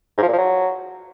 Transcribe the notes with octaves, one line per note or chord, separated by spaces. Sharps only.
G#2
F3
A#2
F3
F#3